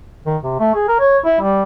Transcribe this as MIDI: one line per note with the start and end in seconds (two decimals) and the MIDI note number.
0.26 0.37 51
0.43 0.56 48
0.59 0.72 57
0.75 0.84 68
0.88 0.99 70
1.00 1.18 73
1.25 1.37 64
1.40 1.63 55